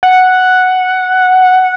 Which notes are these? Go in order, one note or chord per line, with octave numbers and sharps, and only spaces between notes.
F#5